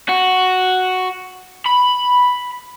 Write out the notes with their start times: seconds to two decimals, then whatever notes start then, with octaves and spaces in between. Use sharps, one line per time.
0.09 F#4
1.66 B5